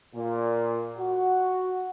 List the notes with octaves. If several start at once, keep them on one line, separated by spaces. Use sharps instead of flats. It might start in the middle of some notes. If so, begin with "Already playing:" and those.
A#2
F#4